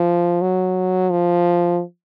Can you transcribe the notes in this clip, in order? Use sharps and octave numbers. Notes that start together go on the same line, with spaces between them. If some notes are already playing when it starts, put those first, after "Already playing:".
Already playing: F3
F#3
F3